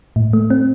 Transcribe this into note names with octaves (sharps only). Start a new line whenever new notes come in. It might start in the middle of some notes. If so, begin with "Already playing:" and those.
A2
A3
C4